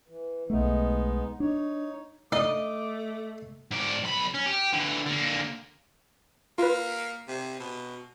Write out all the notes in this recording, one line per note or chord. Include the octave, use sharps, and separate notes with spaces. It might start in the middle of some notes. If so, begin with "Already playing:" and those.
E3
B1 G#3 A3 B3 D#4
D4 D#4 C#5
A3 D#4 D5 D#5 D6
G#2 D5
B1 B5
C#4
G4
D3 E3
D3 A#3
A#3 F4 B4
C3
B2